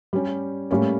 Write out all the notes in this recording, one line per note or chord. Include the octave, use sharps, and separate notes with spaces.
G3 C#4 G4
A2 G3 A#3 C#4